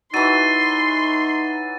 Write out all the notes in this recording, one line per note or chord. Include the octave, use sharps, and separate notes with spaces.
E3 F#3 D#4 C6 A6 D#7